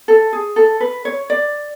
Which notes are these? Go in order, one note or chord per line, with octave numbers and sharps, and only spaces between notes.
A4
G#4
A4
B4
C#5
D5